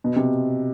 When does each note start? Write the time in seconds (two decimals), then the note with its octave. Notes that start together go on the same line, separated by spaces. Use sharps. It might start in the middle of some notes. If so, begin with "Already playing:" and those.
0.04 B2
0.16 C3